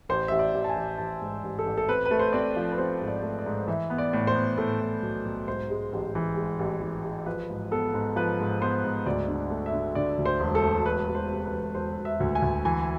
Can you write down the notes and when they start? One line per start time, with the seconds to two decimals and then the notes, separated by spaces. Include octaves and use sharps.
0.09 A1 C5
0.28 A1 E5
0.39 D5
0.54 A1
0.64 A5
0.69 G#5
0.76 A1
0.98 A1 A5
1.21 G#2
1.44 A1
1.59 A4
1.66 A1
1.77 A4
1.88 C4 B4
2.06 B4
2.11 A3
2.19 C5
2.33 C4 D5
2.56 F3
2.72 B4
2.78 C4 C5
3.01 G#2
3.08 D5
3.22 A3
3.39 D5
3.46 G#2
3.68 E3 E5
3.90 B3
3.98 D5
4.13 A2
4.27 C5
4.35 B3
4.58 A2 A4
4.80 A2
5.02 B1
5.25 B1
5.48 G#2 C5
5.70 G#3
5.93 A1
6.15 E3
6.37 G#3
6.59 A1
6.82 E3
7.05 G#3
7.26 F3 B4
7.50 G#2
7.71 B3 A4
7.94 G#2
8.16 F3 B4
8.39 G#2
8.61 B3 C5
8.84 G#2
9.06 D2 D5
9.28 D3
9.36 D5
9.50 A3
9.66 E5
9.73 D3
9.95 D3 D5
10.19 D2
10.25 C5
10.40 E1
10.55 A4
10.63 A3
10.86 E1 B4
11.08 E1
11.15 C5
11.30 C3
11.45 B4
11.52 E1
11.74 E1 C5
11.98 E1
12.05 E5
12.20 D2
12.35 G#5
12.42 D2
12.65 E3 G#5